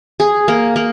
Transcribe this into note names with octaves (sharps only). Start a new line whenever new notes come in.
G#4
A#3
A#3